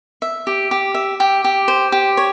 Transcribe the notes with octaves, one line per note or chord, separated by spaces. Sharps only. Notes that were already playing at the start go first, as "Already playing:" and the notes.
E5
G4
G4
E5
G4
G4
C5
G4
C#5